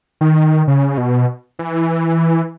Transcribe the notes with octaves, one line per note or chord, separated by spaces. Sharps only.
D#3
C#3
B2
E3